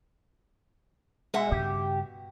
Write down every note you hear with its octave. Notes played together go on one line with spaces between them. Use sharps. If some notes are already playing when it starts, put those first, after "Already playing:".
B2 G#3 E5 F#5
G2 C#3 G4